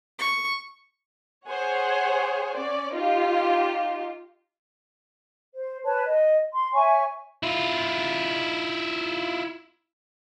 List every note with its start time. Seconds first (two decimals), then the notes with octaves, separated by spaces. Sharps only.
0.19 C#6
1.48 G#4 C5 C#5 F#5 G#5
2.55 C#4 D5
2.95 D#4 F4 G4
5.53 C5
5.84 B4 C#5 A5
6.03 D#5
6.53 C6
6.73 C#5 E5 G#5 C#6
7.43 E4 F4